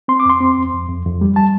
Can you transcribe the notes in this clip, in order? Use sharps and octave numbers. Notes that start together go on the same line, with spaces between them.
C4 C6
D6
F2 C6
C4
F2
F2
F2
F2
G3
G3 A5